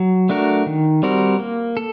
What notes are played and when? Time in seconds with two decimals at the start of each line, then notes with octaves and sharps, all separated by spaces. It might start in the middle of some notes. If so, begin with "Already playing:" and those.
Already playing: F#3
0.29 A3 D4 F#4 A#4
0.66 D#3
1.03 G3 C4 F#4 A#4
1.40 A#3
1.77 A4